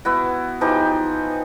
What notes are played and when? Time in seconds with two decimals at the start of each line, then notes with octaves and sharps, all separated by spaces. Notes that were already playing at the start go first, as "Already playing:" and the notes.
0.05 B3 E4 F#4
0.61 E3 F3 D#4 G4